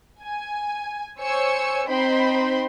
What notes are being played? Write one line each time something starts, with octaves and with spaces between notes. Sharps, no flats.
G#5
C5 C#5 G#5 E6 C#7
C4 D#4 C5 G5 B5 C6